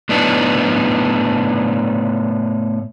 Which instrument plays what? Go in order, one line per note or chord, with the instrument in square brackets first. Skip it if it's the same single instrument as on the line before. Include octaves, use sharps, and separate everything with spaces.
[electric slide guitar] A2 B3 D4 D#4